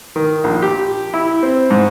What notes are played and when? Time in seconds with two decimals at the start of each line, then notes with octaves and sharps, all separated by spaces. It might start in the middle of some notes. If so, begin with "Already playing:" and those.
0.16 D#3
0.44 A#1
0.62 G4
1.14 E4
1.43 C4
1.71 G#2